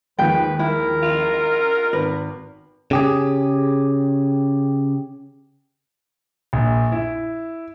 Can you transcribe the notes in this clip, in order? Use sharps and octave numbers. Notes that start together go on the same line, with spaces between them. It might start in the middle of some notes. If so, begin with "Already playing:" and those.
D#2 F3 G#3 B4 G5
E4 A#4
F4
G#1 B4
C#3 G4 G#4
A#1
E4